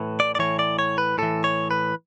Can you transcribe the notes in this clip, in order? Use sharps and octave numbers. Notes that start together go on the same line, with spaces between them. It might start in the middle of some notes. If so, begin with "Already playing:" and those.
Already playing: A2 E3
D5
D5
A2 E3 C#5
D5
C#5
B4
A2 E3 A4
C#5
B4